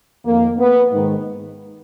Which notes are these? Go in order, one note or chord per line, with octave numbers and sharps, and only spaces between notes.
F2 D#3 A#3
B3
G#2 D#3